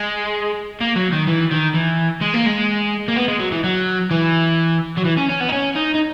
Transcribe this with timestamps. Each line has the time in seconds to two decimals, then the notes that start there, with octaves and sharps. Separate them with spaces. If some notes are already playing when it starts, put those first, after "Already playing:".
Already playing: G#3
0.81 A#3
0.96 F#3
1.12 D#3
1.27 E3
1.51 D#3
1.74 E3
2.21 G#3
2.34 A#3
2.46 G#3
3.08 A#3
3.16 B3
3.28 G#3
3.40 F#3
3.52 E3
3.64 F#3
4.11 E3
4.98 F#3
5.05 E3
5.18 C#4
5.30 C#4
5.41 B3
5.48 D#4
5.52 C#4
5.76 D#4
5.95 D#4